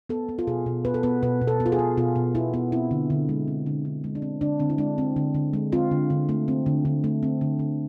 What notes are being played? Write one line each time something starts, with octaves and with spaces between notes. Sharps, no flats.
B3 A4
B3
F4
B2 G#4
B2
B3 B4
A4
B3 B4
B2 B4
B2
A4
B3
F4
G#4
B3
B2 F4
B2
B3 E4
B3
C4 E4
D3
D3
G#3
C4
D3
D3
G#3
D4
C4
D3 D4
D3 C4
E4
G#3 D4
C4
D3
D3
G#3
C4 F4
D3
D3
A3
C4
D3
D3
A3
C4
D3
D3